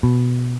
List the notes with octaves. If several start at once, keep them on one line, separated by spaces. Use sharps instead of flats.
B2